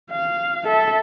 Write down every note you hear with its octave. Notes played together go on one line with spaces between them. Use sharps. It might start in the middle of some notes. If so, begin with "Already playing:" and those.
F5
A4 E5